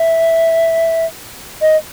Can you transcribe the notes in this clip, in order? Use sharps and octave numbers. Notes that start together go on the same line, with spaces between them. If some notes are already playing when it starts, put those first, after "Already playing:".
Already playing: E5
D#5